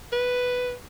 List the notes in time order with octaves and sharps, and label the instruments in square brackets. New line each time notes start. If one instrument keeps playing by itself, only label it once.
[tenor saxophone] B4